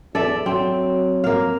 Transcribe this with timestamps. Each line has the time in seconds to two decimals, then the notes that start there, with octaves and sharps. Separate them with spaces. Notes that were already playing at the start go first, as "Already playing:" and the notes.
0.15 E2 A4 D5 E5
0.46 F#3 C4
1.24 A#3 F5